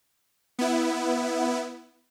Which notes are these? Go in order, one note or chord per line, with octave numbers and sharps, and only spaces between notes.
B3 E4